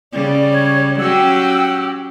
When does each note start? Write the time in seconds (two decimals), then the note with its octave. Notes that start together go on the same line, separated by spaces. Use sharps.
0.13 C#3 G3 D5
0.51 C#5
0.99 F#3 C#4 G4 G5 E6